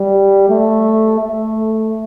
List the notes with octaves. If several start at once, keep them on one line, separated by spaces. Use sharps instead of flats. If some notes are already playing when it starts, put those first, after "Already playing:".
Already playing: G3
A3
A3